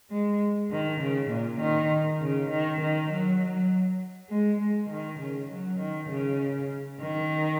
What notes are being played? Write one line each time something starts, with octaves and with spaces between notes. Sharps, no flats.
G#3
D#3
C#3
A#2
D#3
C#3
D#3
D#3
F#3
F#3
G#3
G#3
D#3
C#3
F#3
D#3
C#3
D#3